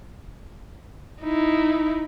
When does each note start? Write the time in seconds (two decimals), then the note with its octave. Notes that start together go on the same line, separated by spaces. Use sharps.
1.21 D#4 E4